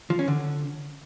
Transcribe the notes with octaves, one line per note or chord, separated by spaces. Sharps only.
F3
C#4
D3